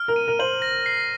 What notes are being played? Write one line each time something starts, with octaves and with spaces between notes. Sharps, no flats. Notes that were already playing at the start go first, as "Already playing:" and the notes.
Already playing: F6
A#4
D#7
A#4
C5 F#7
A#6
C7